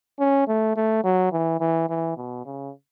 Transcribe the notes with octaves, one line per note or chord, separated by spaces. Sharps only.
C#4
A3
A3
F#3
E3
E3
E3
B2
C#3